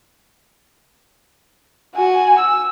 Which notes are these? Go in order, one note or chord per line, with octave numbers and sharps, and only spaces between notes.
F#4 G#5
E6